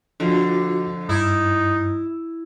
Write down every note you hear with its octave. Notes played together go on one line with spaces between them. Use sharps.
F2 D3 D4 F4 F#4
G2 D#4 E4